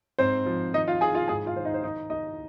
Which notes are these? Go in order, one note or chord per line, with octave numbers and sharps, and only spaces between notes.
G#2 C4 C5
F3
D#3 D#4 D#5
F4 F5
D#3 G#4 G#5
F4 F5
G#2 G#4 G#5
F4 F5
D#3 C5
D#4 D#5
C5
D#3 D#4 D#5
D#3 D#4 D#5